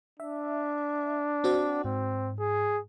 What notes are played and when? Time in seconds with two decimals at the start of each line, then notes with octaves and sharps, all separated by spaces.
0.20 D4 E5
1.44 C4 F#4 D5
1.85 G#2 C4
2.40 G#4